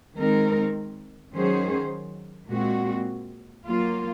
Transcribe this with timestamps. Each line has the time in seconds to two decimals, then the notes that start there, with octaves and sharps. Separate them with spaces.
0.16 D#3 G#3 C4 D#4 A#4
1.32 D#3 F#3 C#4 G#4 C5
2.49 A#2 G#3 C4 F#4
3.65 F#3 A#3 F4